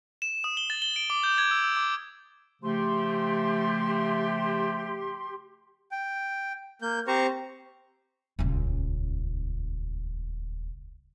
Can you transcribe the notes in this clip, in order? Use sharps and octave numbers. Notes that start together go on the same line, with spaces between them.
E7
D#6
G7
A6
G7
D7
D6
G6
G#6
E6
E6
D6
C#3 F3 A3 G4 C6
G5
A#3 G6
C4 G4 C5 A#5 C#6
D#1 C#2